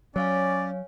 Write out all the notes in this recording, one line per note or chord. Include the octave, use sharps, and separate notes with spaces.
F#3 C#4 C#5 D5 F5 G#5